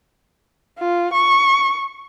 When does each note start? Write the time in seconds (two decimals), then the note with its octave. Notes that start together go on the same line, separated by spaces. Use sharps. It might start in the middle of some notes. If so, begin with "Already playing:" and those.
0.79 F4
1.13 C#6